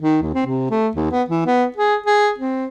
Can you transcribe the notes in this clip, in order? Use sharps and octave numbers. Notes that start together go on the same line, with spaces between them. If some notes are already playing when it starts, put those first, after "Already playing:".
D#3
D#2
C4
C3
A3
D#2
B3
E3
B3
G#4
G#4
C4